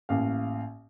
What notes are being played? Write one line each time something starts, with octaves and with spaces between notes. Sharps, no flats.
A1 A#3 F5